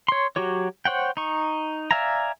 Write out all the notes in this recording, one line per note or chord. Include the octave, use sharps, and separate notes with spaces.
C#5 C6
F#3 F#4 G4 C#5
C5 C#5 F#5 G5
D#4 C#6
D5 E5 F5 G#5 A#5